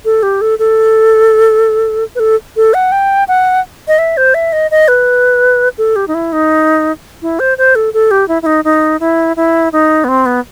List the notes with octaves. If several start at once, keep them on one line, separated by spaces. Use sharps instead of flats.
A4
G4
A4
A4
B4
A4
A4
F#5
G5
F#5
D#5
E5
C5
E5
D#5
D#5
B4
A4
G4
D#4
E4
D#4
E4
C5
C5
A4
A4
G4
E4
E4
D#4
D#4
E4
E4
D#4
B3
C4
B3